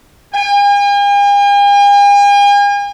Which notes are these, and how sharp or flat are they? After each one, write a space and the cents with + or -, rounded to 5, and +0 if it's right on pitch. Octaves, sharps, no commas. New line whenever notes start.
G#5 -45